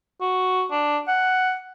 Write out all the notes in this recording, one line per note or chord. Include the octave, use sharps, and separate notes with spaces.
F#4
D4
F#5